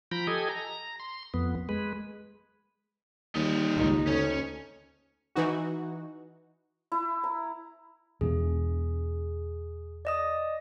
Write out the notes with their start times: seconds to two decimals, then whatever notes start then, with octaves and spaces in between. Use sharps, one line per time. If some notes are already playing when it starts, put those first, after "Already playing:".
0.12 F3 G5 A#5 B5
0.27 G4 A4 D#5 G#5
0.49 A#5
1.00 C6
1.34 F2 B3
1.69 G#3 B4
3.35 D#2 G3 D#5
3.77 C#2 D#4
4.07 D2 C#4
5.36 E3 D#4 F#4
6.92 E4
7.24 A#5
8.21 E2 B2 D4 G#4
10.05 D5 D#5 D#6